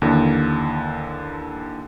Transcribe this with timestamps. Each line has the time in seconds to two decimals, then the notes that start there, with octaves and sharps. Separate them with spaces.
0.02 D#2 D3 E3